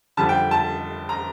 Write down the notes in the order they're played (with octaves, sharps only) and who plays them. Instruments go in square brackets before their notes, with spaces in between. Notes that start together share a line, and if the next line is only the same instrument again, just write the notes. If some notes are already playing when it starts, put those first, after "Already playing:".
[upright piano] F2 D3 G3 A5
G5
A5
A#5